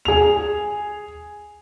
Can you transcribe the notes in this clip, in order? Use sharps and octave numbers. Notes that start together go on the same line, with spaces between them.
G#4 F7